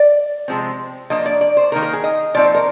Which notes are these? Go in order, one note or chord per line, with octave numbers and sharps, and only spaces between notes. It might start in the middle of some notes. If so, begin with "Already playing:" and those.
Already playing: D5
C3 F3 G#3 C4
F3 A#3 D4 D#5
D5
D5
C5
D#3 A#3 D#4 A#4
A#4
G#4
D#5
A#2 F3 C4 D#4 D5
C5
A#4